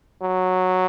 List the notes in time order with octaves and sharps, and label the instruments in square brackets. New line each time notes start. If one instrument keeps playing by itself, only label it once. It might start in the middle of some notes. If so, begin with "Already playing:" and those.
[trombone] F#3